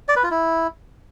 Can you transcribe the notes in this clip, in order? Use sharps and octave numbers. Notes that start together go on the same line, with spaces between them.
D5
B4
F4
E4